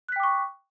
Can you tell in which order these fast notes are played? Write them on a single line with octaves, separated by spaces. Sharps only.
F#6 B6 G5 D6 C#6